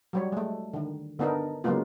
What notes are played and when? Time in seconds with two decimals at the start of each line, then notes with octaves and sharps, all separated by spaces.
0.13 F#3 G3 C#5
0.32 G#3 A3
0.73 D3 D#3
1.19 D3 B3 D4 D#4 A#4
1.64 C#3 F#3 G#3 A#3 B3 F4